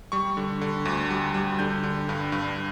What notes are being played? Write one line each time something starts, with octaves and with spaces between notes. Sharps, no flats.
G3 C#6
D3
D3
D2
G3
G3
D3 G6
D3
G2
G2